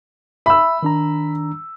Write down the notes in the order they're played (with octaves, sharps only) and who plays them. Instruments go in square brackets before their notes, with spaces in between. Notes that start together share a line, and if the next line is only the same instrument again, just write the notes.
[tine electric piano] E5 [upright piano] B5 E6
[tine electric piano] D#3 D4 A#5